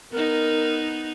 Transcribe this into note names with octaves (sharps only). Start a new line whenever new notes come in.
B3 D#4 A#4